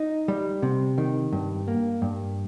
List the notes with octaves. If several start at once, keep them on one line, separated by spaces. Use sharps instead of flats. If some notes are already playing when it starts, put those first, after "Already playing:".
Already playing: D#4
G3
C3
D#3
G2
A#3
G2